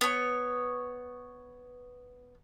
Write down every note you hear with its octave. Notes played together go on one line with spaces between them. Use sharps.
B3 C#5